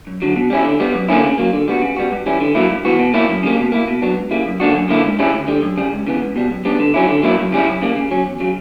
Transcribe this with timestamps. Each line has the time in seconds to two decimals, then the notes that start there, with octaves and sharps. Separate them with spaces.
0.07 F#2
0.22 D3 F#3
0.36 B2
0.50 G3 C#4 E4
0.65 D3
0.80 G3 B3
0.95 F#2
1.09 D3 A#3 C#4 E4
1.24 C#3
1.38 F#3 A#3
1.53 D3
1.68 G3 B3 F#4
1.82 C#3
1.97 G3 B3 F#4
2.12 G2
2.26 E3 G3 C#4 E4
2.41 D3
2.55 F#3 A#3 E4
2.70 G2
2.85 E3 B3 F#4
2.99 B2
3.14 A#3 E4
3.28 F#2
3.43 C#3 G3 A#3
3.58 B2
3.72 A#3 E4
3.88 B2
4.02 F#3 B3 D4
4.16 C#2
4.31 C#3 G3 A#3 E4
4.46 F#2
4.60 D3 A#3 D4 F#4
4.74 F#2
4.89 D3 A#3 E4
5.05 C#2
5.19 C#3 G3 C#4 E4
5.33 D2
5.48 D3 G3
5.62 F#2
5.77 C#3 G3
5.92 C#2
6.07 C#3 E3 B3
6.21 C#2
6.36 B2 G3
6.50 F#2
6.65 C#3 G3 B3 D4
6.80 D3
6.94 F#3 C#4 E4
7.08 D3
7.23 F#3 A#3 E4
7.38 F#2
7.52 C#3 G3 C#4 E4
7.67 F#2
7.82 C#3 G3 A#3
7.96 C#3
8.11 F#3 C#4
8.26 E2
8.40 C#3 F#3